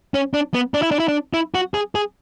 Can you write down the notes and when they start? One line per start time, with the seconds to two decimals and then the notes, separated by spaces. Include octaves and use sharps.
0.14 C#4
0.34 D4
0.54 B3
0.74 D4
0.83 E4
0.91 D4
1.00 E4
1.08 D4
1.34 E4
1.55 F#4
1.74 G#4
1.95 G#4